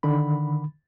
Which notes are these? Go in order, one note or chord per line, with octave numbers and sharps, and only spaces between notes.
D3 D#3 B5